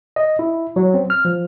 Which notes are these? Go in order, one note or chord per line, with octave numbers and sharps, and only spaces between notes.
D#5
E4
F#3
C4
F6
F3